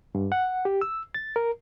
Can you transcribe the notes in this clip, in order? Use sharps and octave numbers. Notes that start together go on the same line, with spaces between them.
G2
F#5
G4
E6
A6
A#4